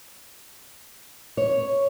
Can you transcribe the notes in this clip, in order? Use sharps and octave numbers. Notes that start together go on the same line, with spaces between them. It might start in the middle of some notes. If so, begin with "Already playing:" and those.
C#5